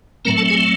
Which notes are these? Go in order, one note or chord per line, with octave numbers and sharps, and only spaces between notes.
A2 F#3 A3 C4 A#4 A#5
A4 A5
G#4 G#5